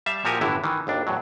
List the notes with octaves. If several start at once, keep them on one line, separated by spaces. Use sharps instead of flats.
G3 E5 F5 A5
A#2 F3 F#4 G4 A#4 G#5
G1 A2 D3 E3 E4
D#3 E3
G#1 D#2 D4
E2 A2 F#3